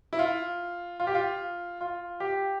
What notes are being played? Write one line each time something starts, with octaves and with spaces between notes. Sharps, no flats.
E4
F4
F4
G4
F4
F4
G4